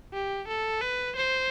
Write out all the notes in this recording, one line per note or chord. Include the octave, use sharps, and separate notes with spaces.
G4
A4
B4
C5